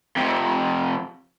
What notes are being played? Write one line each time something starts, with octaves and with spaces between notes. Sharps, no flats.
F2 C3